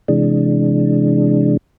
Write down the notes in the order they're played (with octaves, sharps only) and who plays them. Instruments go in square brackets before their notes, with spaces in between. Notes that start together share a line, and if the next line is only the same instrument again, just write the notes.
[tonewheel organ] C3 E3 G#3 D4